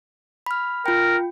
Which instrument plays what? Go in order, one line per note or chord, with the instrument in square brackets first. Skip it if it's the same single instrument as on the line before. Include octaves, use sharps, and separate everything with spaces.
[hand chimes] B5 F6
[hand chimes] F4 G5 [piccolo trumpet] A#4